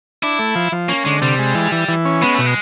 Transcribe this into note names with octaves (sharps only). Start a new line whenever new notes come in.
D4 E4
A3
F3
F3
A#3 C#4
D3 G#3
C3 G3
G#3
E3
E3
E3
C#4
G#3 B3
B2 A3
G#3